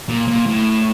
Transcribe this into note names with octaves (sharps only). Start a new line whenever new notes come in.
A#2
A#2
A2